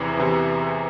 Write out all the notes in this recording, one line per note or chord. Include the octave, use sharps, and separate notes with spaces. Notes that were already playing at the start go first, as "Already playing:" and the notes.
Already playing: E2 C3 E3
E2 C3 E3